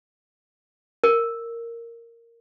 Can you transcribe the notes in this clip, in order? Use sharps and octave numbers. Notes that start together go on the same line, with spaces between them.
A#4